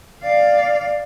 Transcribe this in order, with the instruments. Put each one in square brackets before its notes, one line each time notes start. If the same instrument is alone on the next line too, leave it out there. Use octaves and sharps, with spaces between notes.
[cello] D5 F5